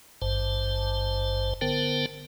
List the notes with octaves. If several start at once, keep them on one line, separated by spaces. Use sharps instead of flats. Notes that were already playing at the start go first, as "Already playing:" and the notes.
G#1 G2 C5 A5
D3 B3 A#4 C5 G5 A5